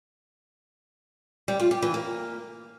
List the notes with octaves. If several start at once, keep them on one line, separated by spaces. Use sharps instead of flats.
G3
F4
G4
E3
A#3